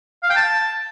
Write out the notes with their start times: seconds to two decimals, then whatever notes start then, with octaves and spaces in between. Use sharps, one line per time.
0.23 F5
0.30 G5
0.36 A5